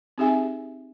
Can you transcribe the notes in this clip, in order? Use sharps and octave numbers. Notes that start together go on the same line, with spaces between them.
C4 D#4 G4 G#4 E5 G#5